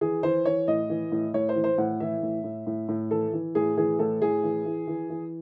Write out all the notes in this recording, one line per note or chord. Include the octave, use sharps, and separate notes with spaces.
E3 G#4
E3 C5
E3 C#5
A2 D#5
E3
A2
A2 C#5
C5
E3
C5
A2 F#5
E3 E5
A2
A2
A2
A2
E3 A4
E3
A2 G#4
E3 G#4
A2 A4
A2 G#4
E3
E3
E3
E3